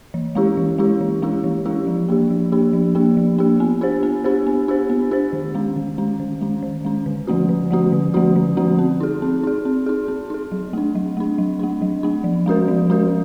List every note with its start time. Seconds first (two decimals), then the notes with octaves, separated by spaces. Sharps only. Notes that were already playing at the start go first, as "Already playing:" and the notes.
0.14 E3
0.35 G#3 C#4 E4 G4
0.57 E3
0.78 G#3 C#4 E4 G4
1.01 E3
1.22 G#3 C#4 E4 G4
1.44 E3
1.66 G#3 C#4 E4 G4
1.87 F3
2.09 A#3 D4 G4
2.31 F3
2.52 A#3 D4 G4
2.73 F3
2.95 A#3 D4 G4
3.17 F3
3.38 A#3 D4 G4
3.60 B3
3.81 D4 G4 C5
4.03 B3
4.24 D4 G4 C5
4.47 B3
4.68 D4 G4 C5
4.90 B3
5.11 D4 G4 C5
5.33 D#3
5.55 G#3 C#4
5.76 D#3
5.98 G#3 C#4
6.20 D#3
6.41 G#3 C#4
6.63 D#3
6.85 G#3 C#4
7.06 D3
7.27 F3 A3 C#4 F#4
7.49 D3
7.71 F3 A3 C#4 F#4
7.92 D3
8.14 F3 A3 C#4 F#4
8.36 D3
8.57 F3 A3 C#4 F#4
8.79 C4
9.01 D#4 G#4
9.22 C4
9.44 D#4 G#4
9.65 C4
9.86 D#4 G#4
10.08 C4
10.30 D#4 G#4
10.52 F#3
10.73 A3 D4
10.95 F#3
11.17 A3 D4
11.38 F#3
11.59 A3 D4
11.82 F#3
12.03 A3 D4
12.24 F3
12.46 G#3 C#4 F#4 A#4
12.68 F3
12.90 G#3 C#4 F#4 A#4